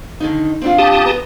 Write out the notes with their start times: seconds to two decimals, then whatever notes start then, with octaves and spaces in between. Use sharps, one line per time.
0.20 D3 D#3 D#4
0.62 C4 D4 F4
0.78 G4 A5 D#6
1.05 B3 A#5